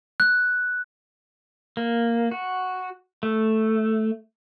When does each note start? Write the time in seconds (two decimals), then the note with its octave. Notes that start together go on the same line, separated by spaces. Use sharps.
0.20 F#6
1.77 A#3
2.31 F#4
3.23 A3